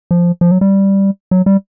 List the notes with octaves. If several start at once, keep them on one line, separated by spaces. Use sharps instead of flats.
F3
F3
F#3
G3
F#3
G3